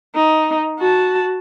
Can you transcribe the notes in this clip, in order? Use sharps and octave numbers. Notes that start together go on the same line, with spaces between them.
D#4
F#4 A5